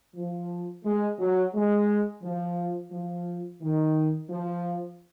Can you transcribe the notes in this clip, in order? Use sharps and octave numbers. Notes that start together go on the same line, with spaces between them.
F3
G#3
F#3
G#3
F3
F3
D#3
F3